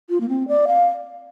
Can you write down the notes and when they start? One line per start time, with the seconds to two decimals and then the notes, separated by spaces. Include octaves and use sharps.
0.10 F4
0.20 A#3
0.29 C4
0.48 D5
0.67 F5